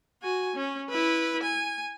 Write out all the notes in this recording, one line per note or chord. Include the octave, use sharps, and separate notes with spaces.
F#4 G#5
C#4
E4 B4
G#5